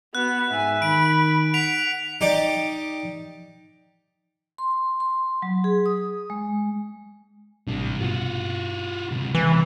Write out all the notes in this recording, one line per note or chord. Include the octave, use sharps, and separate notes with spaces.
B3 F#4 F#6
G#2 E5 G#5
D#3 B5 D7
F#5 B6 D7 F7
D#4 G4 D5
C6
C6
F#3
G#4
D#6
G#3
A1 C3 G3 D4
G2 B2 F4 F#4
C#2 C3
E3